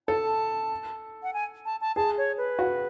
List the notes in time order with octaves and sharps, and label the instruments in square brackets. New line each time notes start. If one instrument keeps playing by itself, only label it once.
[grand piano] A4 [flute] A5
[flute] F#5
G#5
A5
A5
[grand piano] G#4 [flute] A5
[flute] C#5
B4
[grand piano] F#4